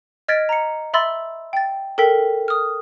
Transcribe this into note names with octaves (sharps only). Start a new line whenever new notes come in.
D#5 F6 G#6 A6 B6 D7
A#5 C#7
E5 B5 C6 E6 A6
G5 A6
A4 A#4 G5 B6
D#6 F6